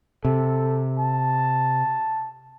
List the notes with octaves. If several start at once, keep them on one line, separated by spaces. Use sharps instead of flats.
C3 A4
A5